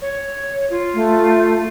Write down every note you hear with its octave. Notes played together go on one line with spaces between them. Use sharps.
C#5
F4
A3